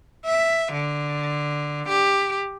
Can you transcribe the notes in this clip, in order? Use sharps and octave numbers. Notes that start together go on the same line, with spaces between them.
E5
D3
G4